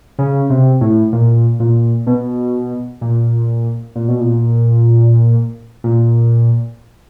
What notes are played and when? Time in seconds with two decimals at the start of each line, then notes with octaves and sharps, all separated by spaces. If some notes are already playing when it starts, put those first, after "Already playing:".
0.19 C#3
0.50 C3
0.81 A2
1.13 A#2
1.60 A#2
2.07 B2
3.01 A#2
3.96 A#2
4.08 B2
4.21 A#2
5.84 A#2